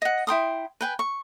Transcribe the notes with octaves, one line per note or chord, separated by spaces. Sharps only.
D#5 F#5
E4 G5 C6 D#6
B4 G5 G#5
C#6